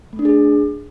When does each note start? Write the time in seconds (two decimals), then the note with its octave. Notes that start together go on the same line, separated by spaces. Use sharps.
0.13 A3
0.19 D4
0.25 G#4